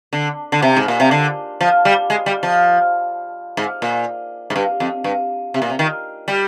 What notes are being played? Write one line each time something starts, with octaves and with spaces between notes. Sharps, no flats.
D3
D3
C3
G#2
A#2
C3
D3
F3
G3
G#3
G3
F3
G#2
A#2
G#2
G2
F2
G2
C3
A#2
C3
D#3
G3